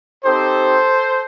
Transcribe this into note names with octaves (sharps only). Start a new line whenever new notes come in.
C4 D#4 G4 A4 C5